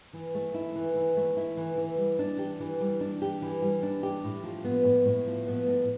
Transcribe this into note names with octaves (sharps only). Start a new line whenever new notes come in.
E3
A3
E4
E3
E3
A3
E4
E3
E3
G3
D4
G4
E3
G3
D4
G4
E3
G3
D4
G4
A2
F3
B3
A2
A2
F3
B3
A2